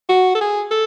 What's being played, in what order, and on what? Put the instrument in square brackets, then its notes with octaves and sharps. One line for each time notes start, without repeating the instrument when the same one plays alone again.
[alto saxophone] F#4
A4
G#4
A4